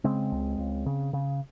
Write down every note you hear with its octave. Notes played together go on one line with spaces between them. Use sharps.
C#3 G#3 C4
C#2
C#2
C#3
C#3